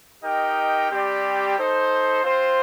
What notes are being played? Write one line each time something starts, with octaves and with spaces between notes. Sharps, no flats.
D#4 G4 A#4 D#5 G5
G3 C4 G4 D5
D#4 A4 C5
C4 F4 C5